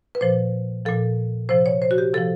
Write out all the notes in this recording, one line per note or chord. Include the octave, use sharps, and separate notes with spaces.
B4
A#2 F3 C5
A#2 F3 A4
C3 F3 C5
C#5
C5
F#4
G4
C3 F3 A4